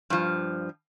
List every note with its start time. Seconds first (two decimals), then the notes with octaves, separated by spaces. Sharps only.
0.10 G2 F3